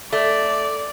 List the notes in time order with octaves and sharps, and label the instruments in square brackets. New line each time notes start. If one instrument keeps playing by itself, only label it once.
[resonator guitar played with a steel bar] A3 [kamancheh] D5